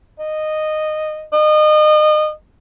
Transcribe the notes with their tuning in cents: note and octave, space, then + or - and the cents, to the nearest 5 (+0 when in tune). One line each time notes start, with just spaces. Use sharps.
D#5 -10
D#5 -30